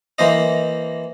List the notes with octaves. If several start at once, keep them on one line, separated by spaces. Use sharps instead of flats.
E3 A#3 C5 D#5